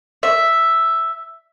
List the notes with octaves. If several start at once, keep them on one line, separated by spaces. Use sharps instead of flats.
E5